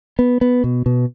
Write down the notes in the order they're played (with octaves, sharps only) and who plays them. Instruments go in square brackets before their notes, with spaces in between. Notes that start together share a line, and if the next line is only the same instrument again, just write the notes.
[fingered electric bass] B3
B3
B2
B2